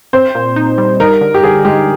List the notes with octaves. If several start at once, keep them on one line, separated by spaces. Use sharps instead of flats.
C4 C5
A#2
D#4
G3
D#4 A#4
D3
G4
D3 G#4
G#3 G4